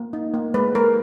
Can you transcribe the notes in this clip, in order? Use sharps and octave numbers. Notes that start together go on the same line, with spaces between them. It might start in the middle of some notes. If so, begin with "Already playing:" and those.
Already playing: A#3
D#4
A#3
G#3 B4
G#3 A#4